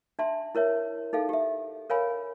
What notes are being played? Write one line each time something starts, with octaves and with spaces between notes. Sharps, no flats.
D4 E5 A5 C6
E4 A#4 C#5 E5
D#4 G#4 A4 F5
G4 E5
A#4 C#5 F5 G#5 B5